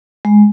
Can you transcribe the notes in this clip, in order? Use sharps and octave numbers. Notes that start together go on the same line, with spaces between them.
G#3